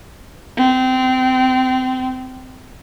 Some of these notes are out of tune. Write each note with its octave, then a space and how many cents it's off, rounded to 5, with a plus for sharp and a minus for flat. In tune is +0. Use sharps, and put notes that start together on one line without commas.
C4 -25